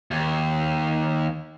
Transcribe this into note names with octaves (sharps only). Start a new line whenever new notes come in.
D#2